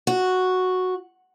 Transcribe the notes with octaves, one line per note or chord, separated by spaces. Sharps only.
F#4